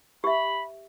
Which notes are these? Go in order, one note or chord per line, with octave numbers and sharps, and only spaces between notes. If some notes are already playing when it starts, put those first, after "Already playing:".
G4 E5 B5